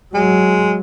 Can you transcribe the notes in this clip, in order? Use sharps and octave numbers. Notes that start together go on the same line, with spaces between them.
F#3 G#3